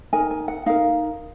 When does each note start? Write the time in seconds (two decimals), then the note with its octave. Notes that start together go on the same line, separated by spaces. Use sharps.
0.13 D#4 A#4 G#5
0.31 G#5
0.48 F#5
0.66 D#4 A#4 F5